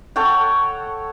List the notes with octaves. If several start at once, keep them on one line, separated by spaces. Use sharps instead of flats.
A4 C#5 F#5 G5